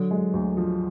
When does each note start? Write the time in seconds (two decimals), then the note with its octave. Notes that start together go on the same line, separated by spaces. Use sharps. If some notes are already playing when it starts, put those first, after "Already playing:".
Already playing: D3 F#3
0.11 G#3
0.34 D2
0.57 F3